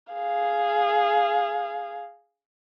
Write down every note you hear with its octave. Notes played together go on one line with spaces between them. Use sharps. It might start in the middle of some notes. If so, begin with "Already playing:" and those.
G#4 F5